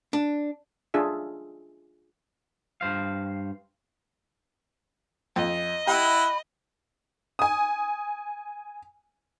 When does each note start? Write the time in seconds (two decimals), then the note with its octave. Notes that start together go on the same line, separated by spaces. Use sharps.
0.13 D4
0.94 D4 F4 G#4 E5
2.81 G2 C5 F5
5.36 F2 D#5
5.87 E4 G4 F#5 B5
7.39 G#5 D#6